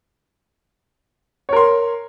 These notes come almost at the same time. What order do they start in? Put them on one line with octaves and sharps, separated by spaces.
C#5 A#4 C6